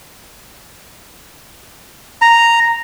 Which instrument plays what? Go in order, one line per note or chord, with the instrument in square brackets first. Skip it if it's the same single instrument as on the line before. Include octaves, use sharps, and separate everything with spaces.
[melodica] A#5